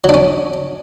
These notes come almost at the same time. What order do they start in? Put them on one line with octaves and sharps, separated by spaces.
F#3 D4 C#4